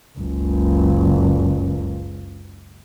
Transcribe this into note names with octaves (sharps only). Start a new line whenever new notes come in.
F#1 C#2